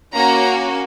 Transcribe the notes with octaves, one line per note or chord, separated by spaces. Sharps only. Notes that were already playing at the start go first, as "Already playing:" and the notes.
A#3 C#4 F#4 A#5